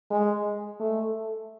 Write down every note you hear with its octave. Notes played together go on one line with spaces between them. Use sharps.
G#3
A3